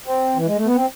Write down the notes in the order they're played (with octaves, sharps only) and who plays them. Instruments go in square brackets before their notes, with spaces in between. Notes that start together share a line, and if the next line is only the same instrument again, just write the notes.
[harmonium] C4
E3
G#3
A3
B3
C4